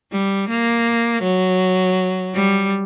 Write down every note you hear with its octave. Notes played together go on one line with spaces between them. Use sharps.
G3
A#3
F#3
G3